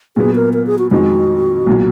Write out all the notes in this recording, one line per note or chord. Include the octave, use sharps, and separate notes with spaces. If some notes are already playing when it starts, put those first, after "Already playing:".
A#2 F#3 B3 G#4
A#4
A#4
G#4
F#4
F2 D#3 G#3 F#4
B1 A#2 F#3